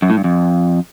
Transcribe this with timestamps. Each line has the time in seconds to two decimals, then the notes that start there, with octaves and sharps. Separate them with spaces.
0.02 F#2
0.10 A2
0.17 G2
0.24 F2